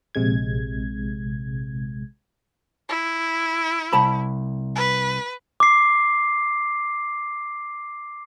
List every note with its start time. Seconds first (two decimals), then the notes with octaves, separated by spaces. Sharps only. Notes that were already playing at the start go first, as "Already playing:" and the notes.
0.15 A#1 C3 G#3 G#6
2.89 E4
3.93 C2 A5 B5
4.76 B4
5.60 D6 C7